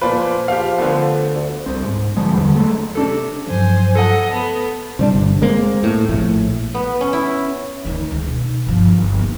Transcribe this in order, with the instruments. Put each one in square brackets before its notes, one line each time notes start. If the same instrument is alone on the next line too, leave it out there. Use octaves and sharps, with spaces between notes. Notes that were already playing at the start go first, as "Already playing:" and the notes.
[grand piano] A#2 B4 [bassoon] F3
[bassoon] F3 [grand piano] G4 F5
[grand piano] D3 A3 B3
[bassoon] D2
[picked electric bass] C2 C4
G#2
A1 D3 F3 G#3
E2 D3 G3
F#3 G#3 A3
[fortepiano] C3 D4 A4
[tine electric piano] G2 F3 F#3 [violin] C5 G#5
[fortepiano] A4 F#5 [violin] D#5
[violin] A3 B3 [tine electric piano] A5 B5
[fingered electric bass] C3 G3 D4
G1
G#3 A#3 C4
A2
A#1 A2
[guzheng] B3
C#4
E4
[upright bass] D2 D#3
C#2
B2 D#4
G1 F3
G1
D#3 A#3